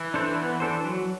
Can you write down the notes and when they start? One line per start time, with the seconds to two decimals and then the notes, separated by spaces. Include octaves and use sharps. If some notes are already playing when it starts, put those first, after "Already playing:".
Already playing: E3
0.14 D4 A4 C5
0.38 B3
0.60 D4 A4 C5
0.84 F#3